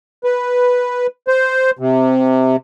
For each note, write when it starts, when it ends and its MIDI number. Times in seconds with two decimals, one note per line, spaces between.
0.24 1.07 71
1.28 1.71 72
1.79 2.56 48